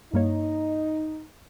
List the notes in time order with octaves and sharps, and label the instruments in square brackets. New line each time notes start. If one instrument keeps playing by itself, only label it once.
[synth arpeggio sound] G2 A#3 C#5 [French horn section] D#4